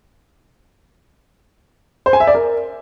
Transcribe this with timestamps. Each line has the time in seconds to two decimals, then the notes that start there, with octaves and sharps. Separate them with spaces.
2.06 C5
2.13 G#5
2.20 E5
2.27 D5
2.35 A#4